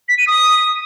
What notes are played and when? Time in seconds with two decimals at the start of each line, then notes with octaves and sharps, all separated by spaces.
0.09 B6
0.18 D#7
0.27 D#6